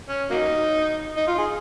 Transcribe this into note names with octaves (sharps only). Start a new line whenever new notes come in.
C#4
F#3 A#3 D#4
D#4
F4
G#4